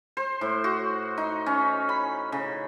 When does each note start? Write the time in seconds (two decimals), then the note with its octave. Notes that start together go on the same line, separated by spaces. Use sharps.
0.17 C5
0.41 A2
0.64 F#4
1.18 D#4
1.46 C#4
1.89 B5
2.32 C#3